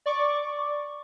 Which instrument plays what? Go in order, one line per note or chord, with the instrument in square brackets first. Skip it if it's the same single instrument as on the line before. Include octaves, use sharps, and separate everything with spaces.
[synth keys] D5 C#6 D6